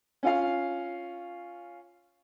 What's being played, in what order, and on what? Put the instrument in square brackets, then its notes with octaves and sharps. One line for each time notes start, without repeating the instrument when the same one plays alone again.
[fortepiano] C#4 F4 F5